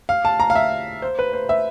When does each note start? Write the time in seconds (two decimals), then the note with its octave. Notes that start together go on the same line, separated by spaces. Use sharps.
0.09 F5
0.25 A5
0.40 A#5
0.50 F5
0.55 E5
1.02 C5
1.19 B4
1.33 C5
1.49 E5